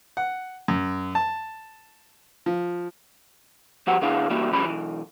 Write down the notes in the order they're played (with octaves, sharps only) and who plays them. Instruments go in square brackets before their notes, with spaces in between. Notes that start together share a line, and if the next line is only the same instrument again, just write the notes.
[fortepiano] F#5
F#2
A5
F3
[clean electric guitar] F3 B3 F#4 G4 F#5
D3 B3 D4 E4 G#4 F5
E3 G3 A#3 E4 F#4
D2 C#3 F3 G3 B5
B1 G#2 E3